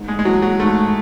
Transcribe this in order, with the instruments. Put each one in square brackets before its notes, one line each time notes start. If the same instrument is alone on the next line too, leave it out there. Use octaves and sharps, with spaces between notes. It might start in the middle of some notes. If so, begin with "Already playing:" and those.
Already playing: [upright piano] G#2
[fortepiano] G#3
G#3
[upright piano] E3 [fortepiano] F#3
[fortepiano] F#3
[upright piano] G#2 [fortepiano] A3